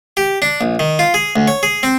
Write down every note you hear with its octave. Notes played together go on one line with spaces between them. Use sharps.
G4
D4
A#1
D#3
F4
G#4
D2
C#5
G#4
C4